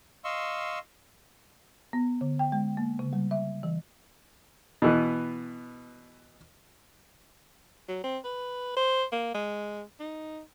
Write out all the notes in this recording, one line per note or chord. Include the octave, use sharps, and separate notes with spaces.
D#5 F5 C6 C#6 E6
B3
D3
G5
G#3
A#3
C#3
G3
E5
E3
B2 E3 B3
F#3
C4
B4
C5
A#3
G#3
D#4